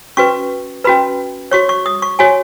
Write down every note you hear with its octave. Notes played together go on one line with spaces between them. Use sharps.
C#4 F#4 B4 C#6
C#4 F#4 B4 B5
F#4 C#5 C#6
C#6
D#6
C#6
F#4 C#5 G#5